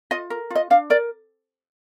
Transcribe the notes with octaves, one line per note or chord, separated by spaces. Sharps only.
F4 D#5
A#4
F4
D#5
D4 F5
A#4 D5